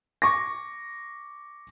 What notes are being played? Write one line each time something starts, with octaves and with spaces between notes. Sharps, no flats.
C#6 D6 A#6